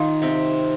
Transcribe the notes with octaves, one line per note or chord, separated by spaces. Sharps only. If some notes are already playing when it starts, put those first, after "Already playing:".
Already playing: D#3 D#4 F4
C3 C4